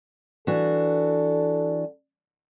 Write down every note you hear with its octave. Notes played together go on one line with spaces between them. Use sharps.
E3 D4 F#4 A4